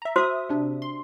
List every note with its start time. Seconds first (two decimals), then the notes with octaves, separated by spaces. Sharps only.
0.02 E5 A#5
0.16 F#4 C5 E5 D#6
0.49 C3 D4
0.82 C6